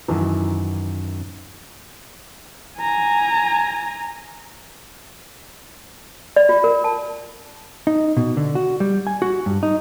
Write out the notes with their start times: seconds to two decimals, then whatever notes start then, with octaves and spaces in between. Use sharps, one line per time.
0.08 F#2 D#3 E3 A5
2.79 G#5 A#5
6.36 D5
6.49 F4
6.64 A#4
6.84 A5
7.87 D#4
8.17 B2
8.37 D3
8.55 F#4
8.80 G3
9.07 G#5
9.22 F#4
9.46 G2
9.63 D#4